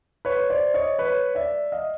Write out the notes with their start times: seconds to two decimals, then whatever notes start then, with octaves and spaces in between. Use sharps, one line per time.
0.25 B4 C#5
0.50 C5 D5
0.74 C#5 D#5
0.98 B4 C#5
1.35 D5 E5
1.72 D#5 F5